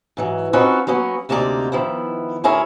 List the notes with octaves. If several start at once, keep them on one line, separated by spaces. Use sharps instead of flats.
G#2 E3 F#3
C4 C#4 D#4 F4 F#4 B4
F#3 A#3 B3 C#4
D2 C3 A#3 D#4 G#4 D5
D#3 F3 B3 E4
D2 C#4 E4 G#4 A#4 C#5